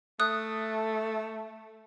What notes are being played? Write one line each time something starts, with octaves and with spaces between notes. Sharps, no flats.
A3 D#6 F#6